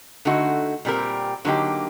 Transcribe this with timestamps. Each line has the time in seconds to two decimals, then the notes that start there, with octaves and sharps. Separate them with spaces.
0.25 D3 A3 D#4 F#4
0.85 A#2 G3 C4 G4 A#4
1.45 D3 F#3 A#3 D#4 G4